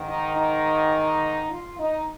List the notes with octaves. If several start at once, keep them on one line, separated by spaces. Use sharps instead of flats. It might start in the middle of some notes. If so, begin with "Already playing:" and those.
Already playing: G#2 D#3
D#4
D#4
F4
D#4